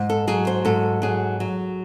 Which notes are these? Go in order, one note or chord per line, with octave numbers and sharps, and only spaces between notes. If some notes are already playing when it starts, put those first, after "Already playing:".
Already playing: G#2
A4
F#3 G#4
C5
G#2 A4
F#3 G#4
F#3